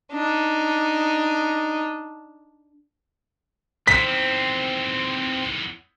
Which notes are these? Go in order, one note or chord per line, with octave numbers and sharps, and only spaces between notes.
D4 D#4
E2 D#3 C4 B6